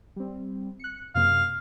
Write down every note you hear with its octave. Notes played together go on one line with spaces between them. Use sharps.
G3 C4
F#6 C#7
F#2 C3 A#3 F5